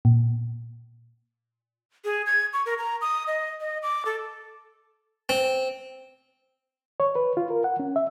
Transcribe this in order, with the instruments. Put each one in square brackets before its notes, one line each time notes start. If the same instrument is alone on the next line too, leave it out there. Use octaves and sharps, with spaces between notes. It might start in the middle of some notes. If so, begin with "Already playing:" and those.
[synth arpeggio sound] A#2
[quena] G#4
G#6
C#6
A#4
A#5
D#6
D#5
D#5
D6
A4
[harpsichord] C4
[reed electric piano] C#5
B4
F4
A#4
F#5
C#4
E5